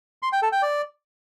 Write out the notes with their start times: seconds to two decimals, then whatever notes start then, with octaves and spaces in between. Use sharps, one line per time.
0.23 C6
0.32 G5
0.42 A4
0.52 G5
0.62 D5